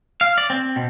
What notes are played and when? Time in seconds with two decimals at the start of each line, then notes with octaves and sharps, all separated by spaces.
0.21 F5
0.38 D5
0.50 C4
0.76 B2